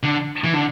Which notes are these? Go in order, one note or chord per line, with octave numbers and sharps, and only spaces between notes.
D3
E3
D3